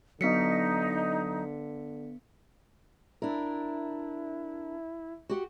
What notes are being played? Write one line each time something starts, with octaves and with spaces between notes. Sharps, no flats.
D3 F#3 B3 D#4 B6 C#7
D4 E4 A#4
F#4 G4 F#5